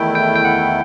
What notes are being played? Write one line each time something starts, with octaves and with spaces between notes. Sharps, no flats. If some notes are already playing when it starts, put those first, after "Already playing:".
Already playing: E2 D#3 A3 E4 G5
G5
G5
F#5